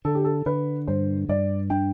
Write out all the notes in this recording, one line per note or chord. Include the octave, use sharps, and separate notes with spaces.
D3 A4
G4
A4
D3 B4
G2 C5
G2 D5
D4 G5